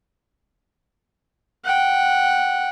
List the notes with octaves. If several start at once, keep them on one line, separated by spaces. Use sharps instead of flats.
F#5 G5